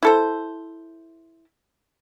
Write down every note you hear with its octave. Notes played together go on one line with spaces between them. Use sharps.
E4 A4 C5